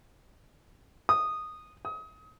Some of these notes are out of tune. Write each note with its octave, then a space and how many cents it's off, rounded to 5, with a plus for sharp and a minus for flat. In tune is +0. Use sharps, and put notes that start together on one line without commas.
D#6 -10
D#6 +30